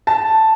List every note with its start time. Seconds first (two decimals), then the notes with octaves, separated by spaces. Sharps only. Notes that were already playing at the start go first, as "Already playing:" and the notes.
0.07 A5